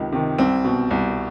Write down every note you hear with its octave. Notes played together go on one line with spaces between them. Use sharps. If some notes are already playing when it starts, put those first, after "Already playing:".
Already playing: C#2 C3 D#3
C3 D#3
C2 C4
B2
C2